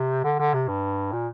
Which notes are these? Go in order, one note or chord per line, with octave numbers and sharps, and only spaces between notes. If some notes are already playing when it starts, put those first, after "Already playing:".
Already playing: C3
D3
D3
C3
G2
A#2